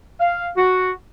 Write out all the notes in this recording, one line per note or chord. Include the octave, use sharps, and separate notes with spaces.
F5
F#4